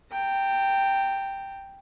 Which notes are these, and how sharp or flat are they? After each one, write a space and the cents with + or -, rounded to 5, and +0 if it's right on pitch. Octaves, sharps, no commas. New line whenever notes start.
G5 +0 A#5 -40